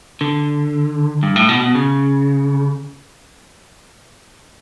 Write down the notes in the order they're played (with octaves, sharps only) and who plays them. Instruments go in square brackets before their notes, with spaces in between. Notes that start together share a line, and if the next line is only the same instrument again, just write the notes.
[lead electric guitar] D3
G2
A2
B2
B2
C#3